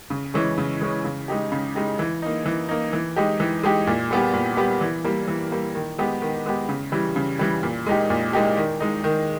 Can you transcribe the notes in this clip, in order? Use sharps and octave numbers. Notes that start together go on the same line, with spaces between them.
C#3
E3 G#3 C#4
C#3
E3 G#3 C#4
C#3
G#3 D#4 G4
C#3
G#3 D#4 G4
E3
A#3 D#4
E3
A#3 D#4
E3
G#3 D#4 G4
E3
G#3 D#4 G4
A#2
G3 B3 G4
A#2
G3 B3 G4
E3
G3 A#3
E3
G3 A#3
D#3
G#3 B3 G4
D#3
G#3 B3 G4
C#3
E3 G3
C#3
E3 G3
A#2
G#3 D#4 G4
A#2
G#3 D#4 G4
D#3
G#3 D#4
D#3